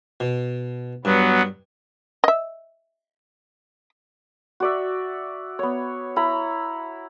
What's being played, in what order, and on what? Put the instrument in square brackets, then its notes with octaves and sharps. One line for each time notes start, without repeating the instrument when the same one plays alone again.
[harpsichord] B2
[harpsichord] G2 [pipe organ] F#3 B3
[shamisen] D#5 E5
[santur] F#4 D5 E5
B3 C#5
E4 A#5 B5